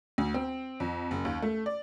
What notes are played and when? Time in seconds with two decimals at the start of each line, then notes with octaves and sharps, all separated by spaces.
0.18 D2
0.34 C4
0.80 F2
1.11 F#1
1.25 D#2
1.42 A3
1.66 D5